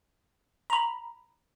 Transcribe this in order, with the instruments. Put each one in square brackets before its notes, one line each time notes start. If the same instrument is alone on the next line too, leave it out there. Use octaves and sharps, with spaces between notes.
[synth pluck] A#5 B5